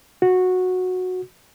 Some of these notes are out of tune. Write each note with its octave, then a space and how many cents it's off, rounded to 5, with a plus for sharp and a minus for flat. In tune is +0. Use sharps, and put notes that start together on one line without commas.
F#4 -10